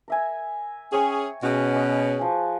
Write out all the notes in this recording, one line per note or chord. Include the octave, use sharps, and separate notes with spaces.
A#4 E5 G#5
C#4 G#4 C#5 G5 G#5
B2 C#4 F#4 G#4
B4 D#5
F3 G#5